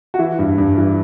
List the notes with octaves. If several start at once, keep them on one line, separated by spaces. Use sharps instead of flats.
F#4
E3 E4
G2
G2
E3